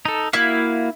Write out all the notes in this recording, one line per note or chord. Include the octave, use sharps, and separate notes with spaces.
D#4 A4
A#3 E4 F#4 F5